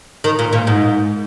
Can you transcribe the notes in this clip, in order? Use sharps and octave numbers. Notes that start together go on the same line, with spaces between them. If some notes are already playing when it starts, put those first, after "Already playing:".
D#3
A#2
A#2
G#2